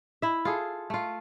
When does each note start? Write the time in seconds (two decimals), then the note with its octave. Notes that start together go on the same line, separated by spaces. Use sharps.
0.22 E4 E5
0.45 F4 G#4 A4
0.90 A3 F4